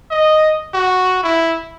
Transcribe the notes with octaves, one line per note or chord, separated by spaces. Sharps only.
D#5
F#4
E4